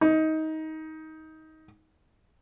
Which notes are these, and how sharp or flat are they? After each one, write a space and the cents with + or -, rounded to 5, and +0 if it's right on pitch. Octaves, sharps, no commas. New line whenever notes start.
D#4 +20